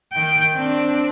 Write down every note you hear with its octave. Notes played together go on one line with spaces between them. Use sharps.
D#3 G5
C4 D4